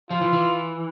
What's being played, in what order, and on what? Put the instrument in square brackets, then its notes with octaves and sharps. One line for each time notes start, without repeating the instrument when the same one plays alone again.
[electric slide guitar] F3 [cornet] F4
[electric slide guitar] E3
E3